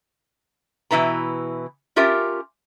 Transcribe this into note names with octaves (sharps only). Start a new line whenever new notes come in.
B2 E3 E4 B4 A#5
C#4 F4 G4 A#4 E5